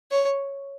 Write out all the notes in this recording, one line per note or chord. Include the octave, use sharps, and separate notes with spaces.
C#5